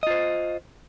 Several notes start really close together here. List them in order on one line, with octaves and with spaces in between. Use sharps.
D#5 F4 C5